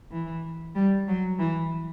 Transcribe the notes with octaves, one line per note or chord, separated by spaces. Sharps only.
E3
G3
F#3
E3